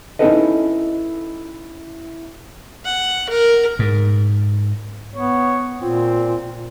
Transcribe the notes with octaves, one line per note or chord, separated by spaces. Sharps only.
C#4 D#4 E4 A4 B4 D#5
F#5
A#4
G#2
B3 C#5
A#2 C4 F4